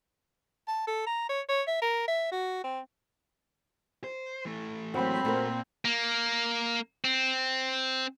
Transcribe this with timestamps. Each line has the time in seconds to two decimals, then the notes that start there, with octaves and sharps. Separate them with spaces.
0.68 A5
0.87 A4
1.07 A#5
1.29 C#5
1.49 C#5
1.67 E5
1.82 A#4
2.08 E5
2.31 F#4
2.64 C4
4.04 C5
4.45 E3 A3
4.94 F#3 A#3 C4 F#4 C5 B5
5.25 A#2 A3 F#4 A#4
5.85 A#3
7.04 C4